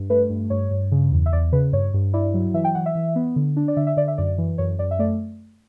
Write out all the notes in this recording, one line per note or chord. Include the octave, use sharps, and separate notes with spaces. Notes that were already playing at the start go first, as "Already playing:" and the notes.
Already playing: G2
A3 B4
G2
G2 C#5
G2
C#3
E2
E5
E2 D5
C#3 B4
G2 C#5
G2
E4 D5
F#3
E3 E5
G5
E3 F#5
E5
E3
B3
D3
D4
D5
D3 E5
E5
D3 D5
E5
F#2 D5
E3
F#2 C#5
F#2 D5
E5
A3 D5